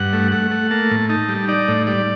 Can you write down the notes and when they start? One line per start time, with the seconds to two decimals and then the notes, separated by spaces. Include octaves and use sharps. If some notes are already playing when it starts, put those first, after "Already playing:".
Already playing: G2 F#5
0.13 A3
0.32 A3 F#5
0.51 A3
0.71 A#3 A5
0.91 A2
1.09 D#4 A5
1.29 G3
1.48 D#4 D5
1.68 A2
1.87 G3 D5